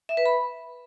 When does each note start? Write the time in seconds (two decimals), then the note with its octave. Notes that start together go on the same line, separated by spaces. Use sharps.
0.09 E5
0.17 B4
0.26 B5